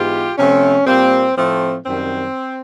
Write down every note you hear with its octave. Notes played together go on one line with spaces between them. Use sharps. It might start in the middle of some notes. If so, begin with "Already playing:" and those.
Already playing: G#2 E3 G#3 B3 F4 G4
C3 F3 A3 C#4
A#2 G3 A#3 C4
A2 F3 A3 C4
F#2 D#3 G3 C4